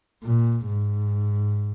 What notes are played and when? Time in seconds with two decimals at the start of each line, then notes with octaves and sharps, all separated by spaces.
0.23 A#2
0.67 G#2